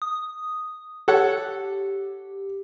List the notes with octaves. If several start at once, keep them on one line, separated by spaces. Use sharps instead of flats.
D#6
G4 A4 C#5 F#5